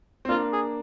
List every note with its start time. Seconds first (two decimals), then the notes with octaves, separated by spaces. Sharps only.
0.25 C4
0.29 A#3 D4 F4
0.53 G#4